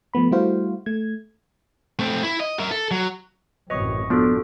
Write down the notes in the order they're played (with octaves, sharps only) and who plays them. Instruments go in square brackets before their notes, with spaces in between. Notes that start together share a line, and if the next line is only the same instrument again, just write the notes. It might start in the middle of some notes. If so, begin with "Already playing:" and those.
[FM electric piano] F3 A3 B3 B5
G3 A3 E4 F#4 C5 F5
A3 G#6
[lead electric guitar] A3 C4
E4
D#5
A#4 E5
A4
F#3
[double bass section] A1 F#2 C3 [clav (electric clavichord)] B4 C#5 [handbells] D#5 C#6 D#6
[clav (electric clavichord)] F3 D4 [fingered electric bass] B3 [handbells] F4 F#4 A4